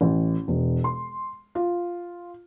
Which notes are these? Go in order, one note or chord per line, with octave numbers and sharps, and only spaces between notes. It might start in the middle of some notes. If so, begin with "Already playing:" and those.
A1
E1
C6
F4